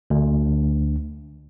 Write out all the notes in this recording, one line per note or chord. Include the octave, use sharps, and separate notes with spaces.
D2